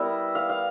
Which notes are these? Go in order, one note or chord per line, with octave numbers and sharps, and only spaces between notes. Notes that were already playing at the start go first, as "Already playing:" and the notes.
Already playing: G3 B3 E4 A#4 E5
F5
F5